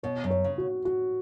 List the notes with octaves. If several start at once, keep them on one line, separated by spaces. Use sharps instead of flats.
B2 C#5
F#2
C#5
C#3
F#4
F#4